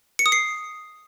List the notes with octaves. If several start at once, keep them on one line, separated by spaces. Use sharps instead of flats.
C#7
D#6
C7